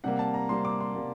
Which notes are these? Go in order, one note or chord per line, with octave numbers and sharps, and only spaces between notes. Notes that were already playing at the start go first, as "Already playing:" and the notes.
C3 G3 A#3 F#5
A5
A#5
C3 G3 A#3 C6
D6
C6
C3 G3 A#3